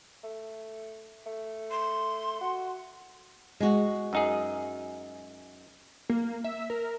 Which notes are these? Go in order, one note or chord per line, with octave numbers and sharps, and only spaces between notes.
A3
A3
C6
F#4
G#3 F#4
F#2 D#4 G#4
A#3
E5
A#4